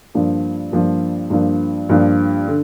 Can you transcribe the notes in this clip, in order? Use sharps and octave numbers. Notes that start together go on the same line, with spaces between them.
G2 F3 A#3 D4
G2 F3 A#3 D4
G2 F3 A#3 D4
G2 F3 A#3 D4
D3